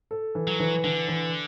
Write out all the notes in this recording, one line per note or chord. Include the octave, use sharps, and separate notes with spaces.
A4
E3
F#3
E3
D3 E3
E3